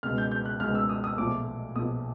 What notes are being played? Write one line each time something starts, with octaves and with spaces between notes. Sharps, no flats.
C#2 B2 G#3 F6
G6
G6
F#6
C#2 B2 G#3 F6
E6
D#6
D#6
B1 A#2 F3 A3 D6
B1 A#2 F3 A3 D#6